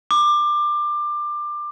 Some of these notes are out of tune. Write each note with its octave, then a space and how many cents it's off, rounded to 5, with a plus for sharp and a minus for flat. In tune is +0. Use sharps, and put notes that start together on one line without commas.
D6 +20